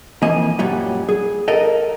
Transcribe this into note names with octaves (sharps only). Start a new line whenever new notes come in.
F2 E3 A#3 D#5 G#5
F#2 A#2 F#3 G3
G#4
A4 A#4 D#5